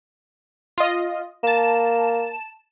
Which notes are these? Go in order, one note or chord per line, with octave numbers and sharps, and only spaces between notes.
F4 D#5
A#3 A5 E7